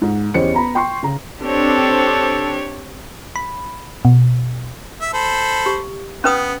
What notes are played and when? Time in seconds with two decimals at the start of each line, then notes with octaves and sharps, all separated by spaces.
0.02 G#2
0.34 E2 C#4 G4 C5 D#5 C#7
0.54 B3 A#5 B5
0.75 G5 C6 C#6 C7
1.03 C#3 A#5
1.42 C4 D4 G4 A4 C#5
3.36 B5
4.05 B2
5.01 E5
5.14 A4 C5 B5
5.66 G4
6.24 B3 C#4 B4 D#6